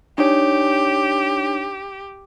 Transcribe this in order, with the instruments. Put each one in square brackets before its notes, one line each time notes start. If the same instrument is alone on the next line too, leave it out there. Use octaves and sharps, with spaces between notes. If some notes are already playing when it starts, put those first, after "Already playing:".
[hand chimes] D4 D#4 C#5 [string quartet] G4